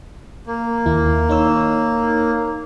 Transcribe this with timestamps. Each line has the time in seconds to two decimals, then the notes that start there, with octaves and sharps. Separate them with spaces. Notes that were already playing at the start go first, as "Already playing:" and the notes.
0.47 A#3
0.86 D#2 E4
1.29 D#4 C#5 E6